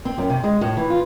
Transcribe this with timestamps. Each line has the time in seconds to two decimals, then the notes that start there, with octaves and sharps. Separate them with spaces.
0.05 C4
0.18 F#2
0.30 C3
0.44 G#3
0.61 A2
0.77 E3
0.90 F4